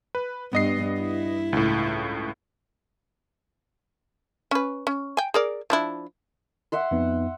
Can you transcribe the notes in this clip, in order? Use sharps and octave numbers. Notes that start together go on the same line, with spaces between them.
B4
G2 B3 D#5 C7
E4
C#2 A2
C#4 B4
C#4
G5 G#5
G#4 A#4 D5
F3 D4 E4
E5 F#5 C6
F2 B3 D#4